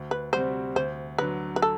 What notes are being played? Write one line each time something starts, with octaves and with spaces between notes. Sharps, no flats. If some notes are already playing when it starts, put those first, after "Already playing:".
Already playing: D2
B4
C3 G3 C4 F#4 C5
D2 C5
D3 F#3 B4
B4
A4